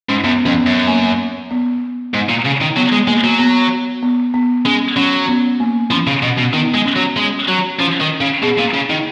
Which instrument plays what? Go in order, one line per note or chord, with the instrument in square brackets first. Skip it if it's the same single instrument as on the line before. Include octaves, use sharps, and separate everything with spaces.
[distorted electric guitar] G#2 [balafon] C#4
[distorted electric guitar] F#2 [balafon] B3
[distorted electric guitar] F2 [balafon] C#4
[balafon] B3
[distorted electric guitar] F#2
[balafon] A#3
B3
[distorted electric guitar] G#2
A#2
C#3
D#3
[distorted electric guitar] F#3 [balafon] B3
[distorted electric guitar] G#3
[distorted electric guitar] G#3 [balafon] A#3
[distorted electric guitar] F#3
[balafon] B3
B3
B3
[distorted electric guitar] G#3 [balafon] C#4
[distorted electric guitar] F#3 [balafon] C#4
[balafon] B3
A#3
[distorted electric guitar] F3 [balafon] C#4
[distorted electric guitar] C#3
B2
B2
[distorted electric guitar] D#3 [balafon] B3
[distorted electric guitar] G#3
[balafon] C#4
[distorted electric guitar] F#3
G#3
F#3
[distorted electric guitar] F3 [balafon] C#4
[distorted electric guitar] D#3
C#3
[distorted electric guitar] B2 [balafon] G#4
[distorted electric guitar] A#2
C#3
D#3